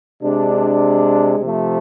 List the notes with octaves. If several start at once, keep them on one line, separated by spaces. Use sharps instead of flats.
C3 G#3 D4
C3 F3 A3